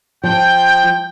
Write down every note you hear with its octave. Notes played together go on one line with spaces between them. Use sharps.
F3 G5 G6